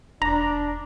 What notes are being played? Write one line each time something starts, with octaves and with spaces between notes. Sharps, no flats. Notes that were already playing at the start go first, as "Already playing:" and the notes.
E1 D4 A#5